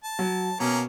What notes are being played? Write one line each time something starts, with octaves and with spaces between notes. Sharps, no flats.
A5
F#3
B2 A#3 C#4 A#5